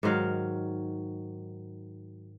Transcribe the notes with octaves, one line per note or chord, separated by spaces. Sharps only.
G#2 D#3 F#3 F5